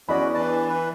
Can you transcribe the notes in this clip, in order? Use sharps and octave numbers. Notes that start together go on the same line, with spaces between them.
E2 C#4 F#4 D5 D#5 B5
E3 D4 B4 A5
B4